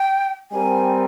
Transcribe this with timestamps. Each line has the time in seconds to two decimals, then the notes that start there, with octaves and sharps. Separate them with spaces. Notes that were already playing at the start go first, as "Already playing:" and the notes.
Already playing: G5
0.51 G3 C4 G4 A#4 G#5